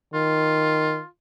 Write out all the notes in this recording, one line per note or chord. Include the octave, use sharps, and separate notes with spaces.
D#3 F4